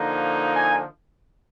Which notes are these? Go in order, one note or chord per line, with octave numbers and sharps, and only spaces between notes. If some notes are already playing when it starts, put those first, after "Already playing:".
Already playing: D3 F3 A#3 D#4
G#5